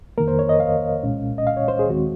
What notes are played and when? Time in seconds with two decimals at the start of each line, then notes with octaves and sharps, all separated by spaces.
0.18 F2 D#3 A#3 A#4
0.28 C5
0.39 C#5
0.49 D#5
0.60 F5
1.03 C2 A#2 G#3 C#4
1.38 D#5
1.47 F5
1.57 C#5
1.68 C5
1.79 G#4
1.89 D#2 D#3 G#3 C4 F#4